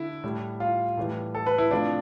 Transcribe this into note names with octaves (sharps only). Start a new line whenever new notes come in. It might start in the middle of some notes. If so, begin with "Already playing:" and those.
Already playing: D3 E4
A2 G3
F4
A2 E3 G3
A4
B4
E4
C3 F3 A3 D4